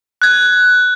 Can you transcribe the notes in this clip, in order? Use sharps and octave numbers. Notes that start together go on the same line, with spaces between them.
F#6 G#6